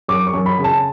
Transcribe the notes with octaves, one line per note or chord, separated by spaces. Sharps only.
F#2 D6
C#6
F#2
B5
C#3
A5